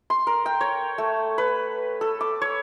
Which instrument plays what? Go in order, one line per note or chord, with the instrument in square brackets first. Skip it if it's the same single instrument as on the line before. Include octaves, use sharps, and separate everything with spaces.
[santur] C6
A#4
G5
C#5
A3
B4
A4
D6
C#5